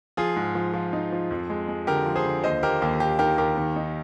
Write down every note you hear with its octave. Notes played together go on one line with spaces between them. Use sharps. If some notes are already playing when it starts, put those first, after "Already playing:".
F3 F4 G#4
G#2
F3
F3
D#4
F3
F2
G#3
G#3
D3 G4 A#4
F3
G#4 C5
D3
D#2 C5 D#5
A#3 G4 A#4
D#2 G4
D#2 G4
D#3 G4 A#4
D#2 G4 A#4
D#3
D#4